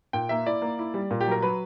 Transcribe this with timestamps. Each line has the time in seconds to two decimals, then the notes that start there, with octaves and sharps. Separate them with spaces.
0.13 A#2 G5
0.29 A#3 E5
0.46 E4 D5
0.62 A#3
0.79 E4
0.94 G3
1.11 A#2
1.21 G4
1.27 F#3 A#4
1.42 F#3 B4